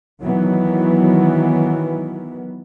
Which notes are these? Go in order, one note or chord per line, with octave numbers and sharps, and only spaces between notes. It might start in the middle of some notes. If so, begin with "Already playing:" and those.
D#3 E3 F#3 B3